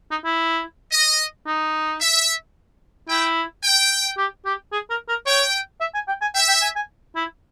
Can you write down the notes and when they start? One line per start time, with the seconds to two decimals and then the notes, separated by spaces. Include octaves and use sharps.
0.11 D#4
0.25 E4
0.92 D#5
1.47 D#4
2.01 E5
3.09 E4 G5
3.63 G5
4.17 G4
4.45 G4
4.72 G#4
4.90 A#4
5.09 A#4
5.26 C#5 G5
5.81 E5
5.94 G#5
6.08 G5
6.21 G#5
6.35 E5 G5
6.48 G5
6.62 G#5
6.76 G#5
7.16 E4